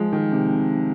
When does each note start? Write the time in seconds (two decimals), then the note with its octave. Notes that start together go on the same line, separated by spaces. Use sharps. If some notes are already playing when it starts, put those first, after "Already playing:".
Already playing: F3 G#3
0.12 D#3
0.32 C3